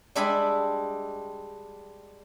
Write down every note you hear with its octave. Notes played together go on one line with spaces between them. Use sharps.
G3 G#3 D4 E5 G#5 B5